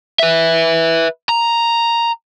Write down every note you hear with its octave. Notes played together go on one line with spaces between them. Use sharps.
B4 E5
A#5